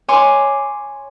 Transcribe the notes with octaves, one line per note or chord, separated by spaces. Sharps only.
C#5 G#5 C6 D6